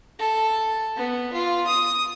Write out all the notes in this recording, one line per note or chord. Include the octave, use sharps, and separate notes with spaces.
A4
B3
F4
D#6